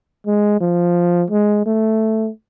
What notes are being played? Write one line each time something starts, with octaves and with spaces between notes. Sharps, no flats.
G#3
F3
G#3
A3